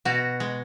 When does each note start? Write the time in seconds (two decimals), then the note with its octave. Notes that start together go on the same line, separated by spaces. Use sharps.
0.05 B2 F#4
0.40 G#3